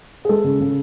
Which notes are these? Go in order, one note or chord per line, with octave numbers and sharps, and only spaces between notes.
G#4
G#3 A4
C#3
C#3